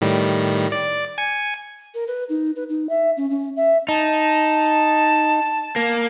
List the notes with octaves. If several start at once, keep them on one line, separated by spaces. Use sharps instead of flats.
A2 D#3 G3
D5
G#5 C#7
A#4
B4
D#4
B4
D#4
E5
C#4
C#4
E5
D#4 A5
A#3